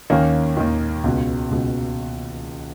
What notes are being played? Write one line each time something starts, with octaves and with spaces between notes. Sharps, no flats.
D#2 D#3 A#3 C#4
D#2 D#3
C#2 B2
C#2 B2